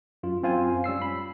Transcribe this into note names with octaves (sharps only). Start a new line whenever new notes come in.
F#2 F4
F#2 C4 F4 F5 G#5
G3 C#4 E6 C7
B5